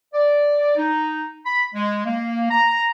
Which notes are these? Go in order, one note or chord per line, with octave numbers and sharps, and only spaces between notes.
D5
D#4
B5
G#3
A#3
A#5